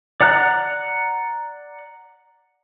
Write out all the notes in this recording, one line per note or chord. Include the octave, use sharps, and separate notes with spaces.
D5 F#5 A#5 F#6